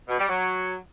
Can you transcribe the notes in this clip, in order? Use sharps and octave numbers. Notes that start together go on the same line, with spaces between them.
B2
G3
F#3